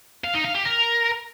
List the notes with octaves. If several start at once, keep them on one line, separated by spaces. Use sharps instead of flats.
F5
D#4
F5
G4
A#4